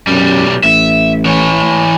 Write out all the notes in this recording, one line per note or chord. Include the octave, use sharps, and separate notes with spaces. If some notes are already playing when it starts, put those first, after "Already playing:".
B1 F#2 G3
A1 E5
E3 C#5